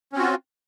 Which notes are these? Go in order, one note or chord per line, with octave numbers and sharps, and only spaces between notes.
C4 C#4 F4 F#4